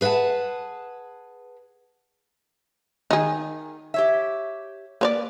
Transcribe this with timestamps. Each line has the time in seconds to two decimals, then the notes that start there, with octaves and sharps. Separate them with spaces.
0.01 G#4 B4 E5 F#5 A5
3.11 D#3 D#4 G#4
3.94 G4 C#5 E5
5.01 A#3 B4 C#5 D5